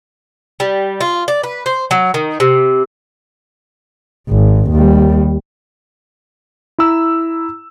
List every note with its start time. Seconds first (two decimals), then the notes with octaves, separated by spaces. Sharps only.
0.60 G3
1.01 F4
1.28 D5
1.43 B4
1.66 C5
1.91 F#3
2.14 D#3
2.40 C3
4.29 G#1
4.71 D#2 G3
6.78 E4 A#5 E6